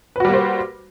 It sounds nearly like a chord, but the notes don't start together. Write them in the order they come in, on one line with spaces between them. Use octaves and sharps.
B4 F#4 G3 A#3 C5